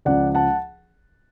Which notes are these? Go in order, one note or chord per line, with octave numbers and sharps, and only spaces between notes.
C#2 C#3 F3 D5 F#5
F#5 A5